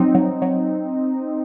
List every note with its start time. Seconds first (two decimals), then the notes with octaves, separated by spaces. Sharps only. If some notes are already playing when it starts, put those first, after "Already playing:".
Already playing: F#3 C4 D#4
0.15 F#3
0.42 F#3